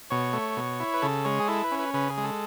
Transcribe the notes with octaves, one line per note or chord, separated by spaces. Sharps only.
B2 C#5
A3
B2
E4
B4
C#3 A4
G#3 C#5
G#4
E4 A4
B4
C#4
B4
C#3 B4
G#4
G#3
A4